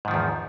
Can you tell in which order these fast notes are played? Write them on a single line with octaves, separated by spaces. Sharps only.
G#2 D#3 F3 E2